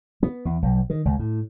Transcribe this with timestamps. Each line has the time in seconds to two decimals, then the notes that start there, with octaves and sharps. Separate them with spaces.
0.23 B3
0.45 E2
0.62 B1
0.90 D#3
1.05 C#2
1.19 A2